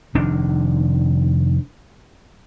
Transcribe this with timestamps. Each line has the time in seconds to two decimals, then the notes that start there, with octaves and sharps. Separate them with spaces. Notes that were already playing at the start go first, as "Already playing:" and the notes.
0.15 F1 D#3 D4